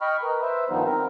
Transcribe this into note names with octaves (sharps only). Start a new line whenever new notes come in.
D#5 G5 B5 C#6 F6
A#4 B4
B4 C5 E5
G2 D#3 F3 G3 B3 D#4
C4 A#4